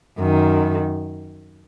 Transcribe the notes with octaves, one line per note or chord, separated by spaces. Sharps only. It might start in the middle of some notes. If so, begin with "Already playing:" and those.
F#2 D#3